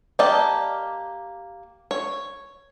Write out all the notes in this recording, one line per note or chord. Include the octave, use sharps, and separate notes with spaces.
A#3 G4 D5 D#5 A5
C#5